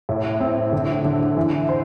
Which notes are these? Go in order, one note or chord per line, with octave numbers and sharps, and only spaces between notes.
A2
C4
D3
D3
E3
C5